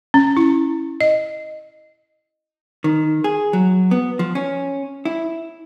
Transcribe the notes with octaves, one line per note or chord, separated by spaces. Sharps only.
C#4
E4
D#5
D#3
G#4
F#3
B3
F3
C#4
E4